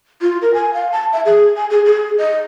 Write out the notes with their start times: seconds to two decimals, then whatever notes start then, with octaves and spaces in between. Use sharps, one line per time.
0.22 F4
0.42 A#4
0.54 G#5
0.74 F5
0.92 A5
1.13 E5
1.26 G#4
1.57 G#5
1.70 G#4
1.85 G#4
2.18 D#5